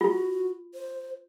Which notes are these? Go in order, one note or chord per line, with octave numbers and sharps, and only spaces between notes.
F4 F#4
C5